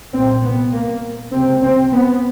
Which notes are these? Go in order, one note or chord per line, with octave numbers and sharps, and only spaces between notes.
C2 A#2 C4
B3
A#3
C#2 C3 C4
C4
B3